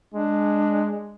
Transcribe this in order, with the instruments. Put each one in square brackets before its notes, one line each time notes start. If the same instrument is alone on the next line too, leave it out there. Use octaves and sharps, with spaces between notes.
[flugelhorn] G#3 [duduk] D4